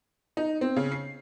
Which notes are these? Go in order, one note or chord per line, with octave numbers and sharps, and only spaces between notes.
D#4
C4
C#3
C7